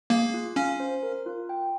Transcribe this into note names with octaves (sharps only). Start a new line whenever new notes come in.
A#3 G#4
F4
C#4 F5
C5
A#4
F4
G5